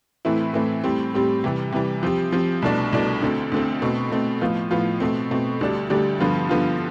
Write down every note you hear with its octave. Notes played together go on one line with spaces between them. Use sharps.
A2 E3 A3 C4 E4
A2 E3 A3 C4 E4
A2 G3 C4 G4
A2 G3 C4 G4
C3 E3 G3
C3 E3 G3
F3 C4 G4
F3 C4 G4
C2 B2 A3 D4
C2 B2 A3 D4
D2 D3 A3 C4
D2 D3 A3 C4
B2 A3 C4
B2 A3 C4
A2 F3 B3 F4
A2 F3 B3 F4
B2 A3 C4
B2 A3 C4
D2 D3 G3 D4 G4
D2 D3 G3 D4 G4
G2 D3 F3 B3 F4
G2 D3 F3 B3 F4